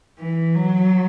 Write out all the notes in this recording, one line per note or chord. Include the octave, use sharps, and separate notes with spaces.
E3
F#3